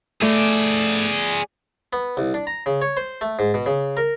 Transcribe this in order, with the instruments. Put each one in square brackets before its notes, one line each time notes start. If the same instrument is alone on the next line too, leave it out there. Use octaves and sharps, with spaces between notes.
[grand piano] A3 [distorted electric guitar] G#4 D5
[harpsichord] B3
C2
D4
A#5
C#3
C#5
C5
A3
G#2
B2
C#3
A#4